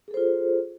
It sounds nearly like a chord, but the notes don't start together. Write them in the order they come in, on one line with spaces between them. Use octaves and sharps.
G#4 A4 C5 F4